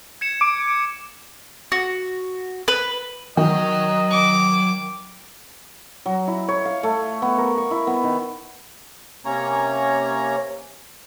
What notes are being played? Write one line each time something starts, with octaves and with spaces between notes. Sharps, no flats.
G#6 C#7 E7
D6
F#4
B4
D#3 F#3 D#5
D6
F#3
E4
C#5
F5
A3
B3
A#4
C#6
E4
B3
D#3
C3 A#3 C#4 C#5 A#5